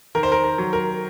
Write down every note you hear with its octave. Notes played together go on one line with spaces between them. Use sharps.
D#3 A#4
C5
A#4
A#4
F#3
A#4